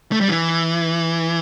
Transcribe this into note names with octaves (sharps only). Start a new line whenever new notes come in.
A3
G3
E3